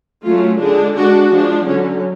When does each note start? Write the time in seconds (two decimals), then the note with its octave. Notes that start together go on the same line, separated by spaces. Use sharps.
0.24 F#3 A3 C#4 F4
0.59 D3 G#3 D4
0.95 G#3 D4 F#4
1.31 F3 G#3 D4
1.67 D3 F#3 C#4